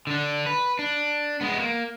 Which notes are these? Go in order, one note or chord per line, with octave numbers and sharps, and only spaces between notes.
D3 D4
B4
D4
G#3 B3
A#3